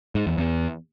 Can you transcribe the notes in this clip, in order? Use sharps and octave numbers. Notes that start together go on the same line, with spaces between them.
G#2
E2
E2